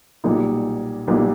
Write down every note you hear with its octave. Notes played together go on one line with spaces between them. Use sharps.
B1 A#2 G3 A#3 D#4
B1 A#2 G3 A#3 D#4